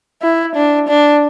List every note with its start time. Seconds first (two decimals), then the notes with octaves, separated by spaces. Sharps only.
0.23 E4
0.56 D4
0.89 D4